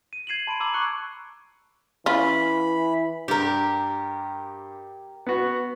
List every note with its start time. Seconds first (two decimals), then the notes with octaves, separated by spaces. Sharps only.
0.13 D#7
0.27 G#6 C7 D#7 E7 F#7
0.47 A5 B5 C6 D7
0.60 A#5 D6 E6 G#6 F#7
0.74 A#5 C#6 F#6 C#7
2.06 E3 C#4 F4 B5
3.28 G2 G4 A#4
5.27 B3 F#4